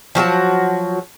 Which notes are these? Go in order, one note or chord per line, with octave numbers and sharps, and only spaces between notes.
F3 F#3 F#4 A5